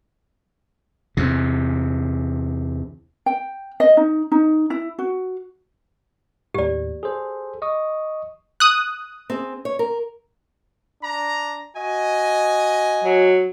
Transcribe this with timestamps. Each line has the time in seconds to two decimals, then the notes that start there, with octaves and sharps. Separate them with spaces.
1.17 E2 C3
3.26 G5
3.80 D#5
3.97 D#4
4.32 D#4
4.70 E4
4.99 F#4
6.54 D#2 A2 G4 D5
7.03 G#4 A4 C5
7.62 D#5 C#6 D#6
8.60 D#6 F#6
9.30 C4 G#4
9.65 C#5
9.79 A#4
11.03 D4 A#5
11.77 F#4 D#5 G#5
13.04 F#3